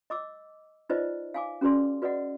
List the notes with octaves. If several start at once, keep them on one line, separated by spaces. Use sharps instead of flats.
D#5 D6 E6
D#4 F4 B4 C5 D5 D#5
F5 G#5 D6
C#4 F#4 G#4 B4 D5 C6
F#4 B4 D5 D#5 F#5